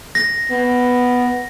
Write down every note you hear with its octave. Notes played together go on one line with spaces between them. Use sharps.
A#6
B3